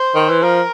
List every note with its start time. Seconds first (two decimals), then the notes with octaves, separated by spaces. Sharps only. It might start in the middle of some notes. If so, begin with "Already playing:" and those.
Already playing: C5
0.15 D#3
0.29 E3
0.43 F3 A#4